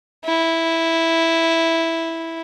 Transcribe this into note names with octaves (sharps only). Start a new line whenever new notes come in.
E4